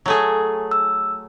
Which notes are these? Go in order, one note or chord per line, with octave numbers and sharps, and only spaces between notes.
F#3 A3 G#4
E6